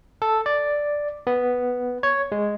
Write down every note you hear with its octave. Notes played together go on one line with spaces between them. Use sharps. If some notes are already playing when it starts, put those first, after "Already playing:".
A4
D5
B3
C#5
G#3